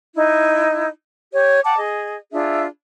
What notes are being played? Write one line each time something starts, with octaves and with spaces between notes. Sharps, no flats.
D#4 E4
G4 C#5
F#5 G5 A5 D6
G#4 D#5
D4 F4 G#4 E5